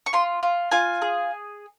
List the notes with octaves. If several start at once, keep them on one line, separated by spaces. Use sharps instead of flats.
C#6
F4 C6
F4
F4 G#5
G#4